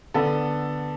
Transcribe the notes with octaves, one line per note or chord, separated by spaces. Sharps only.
D3 B3 A4